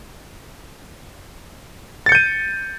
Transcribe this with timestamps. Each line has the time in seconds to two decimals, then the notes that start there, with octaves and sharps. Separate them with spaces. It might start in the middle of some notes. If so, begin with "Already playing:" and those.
2.06 A6
2.09 C#7
2.12 G6
2.15 D#7